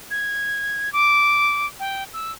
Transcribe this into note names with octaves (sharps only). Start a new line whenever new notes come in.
G#6
D6
G5
E6